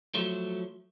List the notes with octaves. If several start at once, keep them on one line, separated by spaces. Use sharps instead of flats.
F3 F#3 A3